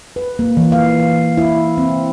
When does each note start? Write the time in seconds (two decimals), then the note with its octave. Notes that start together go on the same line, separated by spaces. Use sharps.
0.16 B4
0.39 A#3
0.57 E3
0.72 F5
1.37 E4
1.78 C4